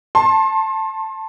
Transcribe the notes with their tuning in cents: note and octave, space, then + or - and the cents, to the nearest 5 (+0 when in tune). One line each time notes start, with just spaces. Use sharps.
A5 +0 C6 +35